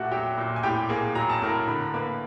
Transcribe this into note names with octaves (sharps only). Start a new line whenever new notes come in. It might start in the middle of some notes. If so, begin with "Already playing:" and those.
Already playing: A#2 A3 F#4 G4 F#5
F#3 G4 G5
A#2
G#5
A2 G4 G5
A#3 G#4 G#5
F#3 A#5
A5
A2 A#4 A#5
D3 B5
A#5
A#3 B4 B5